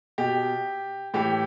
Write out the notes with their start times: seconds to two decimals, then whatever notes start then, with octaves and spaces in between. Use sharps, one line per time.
0.18 B2 G4
1.14 A2 E3 G4